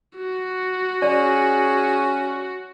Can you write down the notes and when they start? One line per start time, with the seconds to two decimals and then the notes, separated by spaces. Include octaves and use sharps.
0.18 F#4
1.02 C#4 G#4 D5